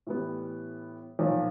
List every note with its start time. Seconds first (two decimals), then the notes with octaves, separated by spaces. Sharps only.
0.07 A2 E3 G3 B3
1.19 B1 A#2 F3 A#3